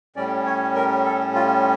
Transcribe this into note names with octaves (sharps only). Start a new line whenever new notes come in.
A2 G3 C#4 D5
C#5
A#4
A4
F4